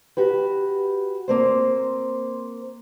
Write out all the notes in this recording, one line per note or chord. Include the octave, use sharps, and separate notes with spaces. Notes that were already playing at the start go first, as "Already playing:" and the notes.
F#4 G4 B4
A#3 C4 C5